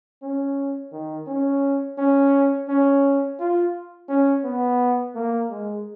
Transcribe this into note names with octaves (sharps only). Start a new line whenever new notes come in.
C#4
D#3
C#4
C#4
C#4
F4
C#4
B3
A#3
G#3